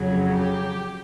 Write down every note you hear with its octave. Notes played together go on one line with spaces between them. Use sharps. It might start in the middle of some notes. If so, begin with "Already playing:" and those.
Already playing: F2 C#3 F#3
G4